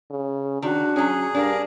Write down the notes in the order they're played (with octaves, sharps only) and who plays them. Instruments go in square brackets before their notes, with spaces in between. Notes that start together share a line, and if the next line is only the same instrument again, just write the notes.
[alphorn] C#3
[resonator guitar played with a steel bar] D#3 [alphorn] D4 [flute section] F#4
[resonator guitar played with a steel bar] F#3 C#4 [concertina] G#4
[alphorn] G2 [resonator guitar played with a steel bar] D4 [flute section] G4 A#4 F5